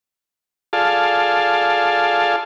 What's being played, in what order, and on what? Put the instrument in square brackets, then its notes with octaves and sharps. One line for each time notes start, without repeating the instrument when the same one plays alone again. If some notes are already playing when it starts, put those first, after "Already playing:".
[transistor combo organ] F4 G#4 A4 D5 F5 A5